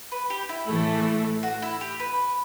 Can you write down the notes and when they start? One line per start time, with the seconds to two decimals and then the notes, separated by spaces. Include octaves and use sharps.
0.12 B4
0.30 G4
0.49 E4
0.68 A2 E3 A3
1.43 F#4
1.62 E4
1.81 G4
2.00 B4